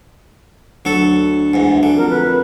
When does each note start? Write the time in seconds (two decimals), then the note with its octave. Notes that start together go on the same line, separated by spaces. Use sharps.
0.85 D2 F#3 A4
1.54 E2 G#2
1.83 D3
1.97 F2 A#4
2.10 B4